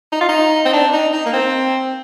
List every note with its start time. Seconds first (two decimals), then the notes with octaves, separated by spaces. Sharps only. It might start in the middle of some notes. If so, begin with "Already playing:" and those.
0.12 D#4
0.21 F4
0.29 D#4
0.65 C4
0.73 D4
0.93 D#4
1.13 D#4
1.26 A#3
1.33 C4